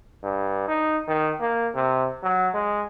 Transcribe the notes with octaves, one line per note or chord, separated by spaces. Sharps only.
G2
D#4
D#3
A#3
C3
F#3
G#3